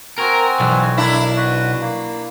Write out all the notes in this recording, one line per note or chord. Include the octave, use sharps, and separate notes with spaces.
C4 F#4 A#4 G#5
B1 E2
D4 E4 A#4
F#4 B4
A#3